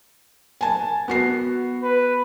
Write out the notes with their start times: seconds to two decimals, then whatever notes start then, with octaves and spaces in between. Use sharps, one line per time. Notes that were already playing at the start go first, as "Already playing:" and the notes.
0.61 G#5 A5
1.08 B3 F#4 C7
1.83 B4